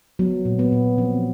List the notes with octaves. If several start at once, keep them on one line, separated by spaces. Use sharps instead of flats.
F#3 B3
A#2
B3
A#2
F3 C4